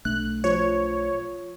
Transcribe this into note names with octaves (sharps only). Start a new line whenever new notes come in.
B1 A3 D4 F#6
F3 C#5